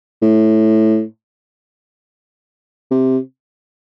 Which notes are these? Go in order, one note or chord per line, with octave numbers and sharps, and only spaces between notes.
A2
C3